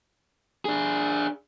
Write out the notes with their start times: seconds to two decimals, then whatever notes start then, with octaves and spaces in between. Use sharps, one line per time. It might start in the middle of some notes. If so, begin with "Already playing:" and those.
0.65 D4 G#4